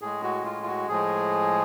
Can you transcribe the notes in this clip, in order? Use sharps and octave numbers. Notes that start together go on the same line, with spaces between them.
A2 G#3 G#4
F#4
F4
F4
F#4
A2 F3 G#3 G#4